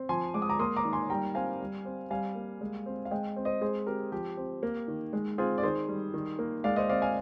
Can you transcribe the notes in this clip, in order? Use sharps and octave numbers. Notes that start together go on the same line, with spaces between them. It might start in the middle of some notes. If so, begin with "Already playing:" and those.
Already playing: C4
F3 G#5 C6
G#3 D6
D#6
A#5 D6
A#3 C6 D#6
A#5 D6
D#3
G#5 C6
G3 G5 A#5
C4 F5 G#5
G3
C4
G3 F5 G#5
A#3
G#3
C4
F5
G#3 D#5 G5
C4
C5 D#5
G#3 G#4 C5
C4 G4 A#4
F3 G4
C4
A#3
D#3
G#3
C4 F4 G#4
D5
D#3 G#4 C5
G3
D#3
A#3
G#3 D5 F5
C5 D#5
C4 D5 F5
F5 G#5